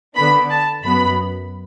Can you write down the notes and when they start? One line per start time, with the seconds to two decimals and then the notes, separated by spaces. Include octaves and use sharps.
0.16 D3 B3 D4 B5
0.50 A5
0.83 F#2 F#3 B3 B5